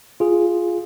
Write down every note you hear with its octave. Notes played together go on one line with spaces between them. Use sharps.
F4 G#4